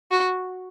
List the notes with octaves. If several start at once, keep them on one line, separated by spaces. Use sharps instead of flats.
F#4